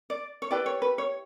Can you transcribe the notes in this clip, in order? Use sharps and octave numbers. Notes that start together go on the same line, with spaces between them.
D5
C#5
E4 G4 B4 D5
C#5
B4
C#5